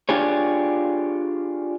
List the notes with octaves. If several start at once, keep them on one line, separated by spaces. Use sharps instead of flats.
D4 F4 G4 G#4 C#5